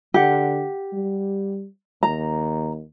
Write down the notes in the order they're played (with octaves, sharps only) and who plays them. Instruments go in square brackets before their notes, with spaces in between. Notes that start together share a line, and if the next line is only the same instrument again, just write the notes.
[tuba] D3 [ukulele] G4 F#5
[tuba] G3
[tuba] D#2 [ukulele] A#5